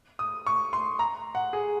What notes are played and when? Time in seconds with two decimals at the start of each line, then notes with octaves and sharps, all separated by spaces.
0.19 D#6
0.47 C#6
0.73 C6
0.99 A#5
1.35 F#5
1.53 G#4